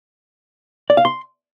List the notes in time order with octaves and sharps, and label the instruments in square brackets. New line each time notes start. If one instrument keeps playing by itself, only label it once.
[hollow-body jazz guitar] D5
F5
C6